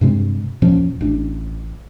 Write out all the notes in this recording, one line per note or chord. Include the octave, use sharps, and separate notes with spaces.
G2 C3 G#3 C4
D#2 A#2 F3 C#4
A1 D4